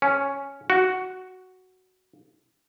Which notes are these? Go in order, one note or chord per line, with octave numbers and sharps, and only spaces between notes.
C#4
F#4